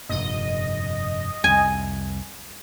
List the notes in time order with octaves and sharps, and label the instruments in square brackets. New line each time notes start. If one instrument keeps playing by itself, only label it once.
[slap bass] F1 G2 A#2 [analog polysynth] D#5
[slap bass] C2 F2 [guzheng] G#5